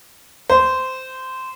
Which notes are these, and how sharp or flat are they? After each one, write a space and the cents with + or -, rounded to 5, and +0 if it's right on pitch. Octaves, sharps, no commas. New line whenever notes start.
C5 -15